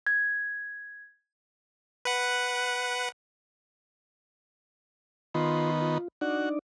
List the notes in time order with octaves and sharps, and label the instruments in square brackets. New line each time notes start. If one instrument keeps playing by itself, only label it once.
[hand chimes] G#6
[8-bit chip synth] B4 F#5
[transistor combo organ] D#3 B3 [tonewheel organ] F4 C6
[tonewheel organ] F4
[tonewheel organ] D4 D#4 D5 [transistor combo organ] F#4